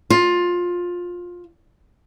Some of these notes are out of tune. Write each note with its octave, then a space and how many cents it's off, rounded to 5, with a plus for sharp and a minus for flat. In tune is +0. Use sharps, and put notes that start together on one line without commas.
F4 +15